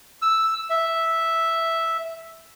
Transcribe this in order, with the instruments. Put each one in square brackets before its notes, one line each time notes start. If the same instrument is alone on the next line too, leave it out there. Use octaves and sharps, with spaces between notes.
[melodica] E6
E5